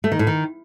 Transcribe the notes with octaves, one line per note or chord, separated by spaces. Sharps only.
A3
D#3
A2
D#3